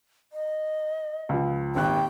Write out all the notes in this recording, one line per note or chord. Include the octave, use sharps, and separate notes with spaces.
D#5
C#2 F3
D#1 G#1 G5 F#6